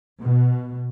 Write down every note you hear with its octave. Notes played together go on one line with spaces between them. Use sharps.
B2